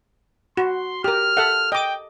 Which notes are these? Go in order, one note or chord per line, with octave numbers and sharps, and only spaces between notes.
F#4 C6
G4 A#4 F6
A4 E5 F#5
D#5 G5 D6